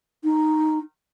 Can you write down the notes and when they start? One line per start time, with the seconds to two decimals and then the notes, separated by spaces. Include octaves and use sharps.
0.24 D#4